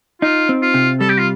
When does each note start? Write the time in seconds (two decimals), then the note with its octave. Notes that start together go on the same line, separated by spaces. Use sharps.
0.22 D#4 F4
0.49 C4
0.62 F4
0.74 C3
1.00 G3 A4
1.09 G4
1.18 F4